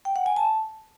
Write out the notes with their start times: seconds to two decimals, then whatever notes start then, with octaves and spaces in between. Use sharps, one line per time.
0.05 G5
0.16 F#5
0.26 G#5
0.36 A5